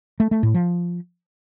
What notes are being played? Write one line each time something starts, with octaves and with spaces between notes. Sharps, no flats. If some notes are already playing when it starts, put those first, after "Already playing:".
A3
A3
A2
F3